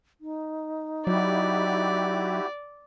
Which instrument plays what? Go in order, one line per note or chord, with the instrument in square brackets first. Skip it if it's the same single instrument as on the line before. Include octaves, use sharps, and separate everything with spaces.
[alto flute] D#4
[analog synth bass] F#3 [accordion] E4 F#4 G4 [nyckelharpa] D5